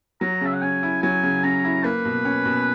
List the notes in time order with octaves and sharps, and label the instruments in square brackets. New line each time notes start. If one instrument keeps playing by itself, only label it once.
[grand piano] F#3 [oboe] A#5
[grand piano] C#3 [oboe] E5
[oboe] F#5
[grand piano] C#4 [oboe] G#5
[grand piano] E4
[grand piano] F#3 [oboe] G#5
[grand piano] C#3
[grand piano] C#4 [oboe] A#5
[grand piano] E4
[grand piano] A#3 [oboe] B4
[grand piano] B2
C#4
B2